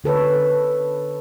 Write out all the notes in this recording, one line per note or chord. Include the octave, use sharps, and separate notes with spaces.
D3 A4 B4 C#5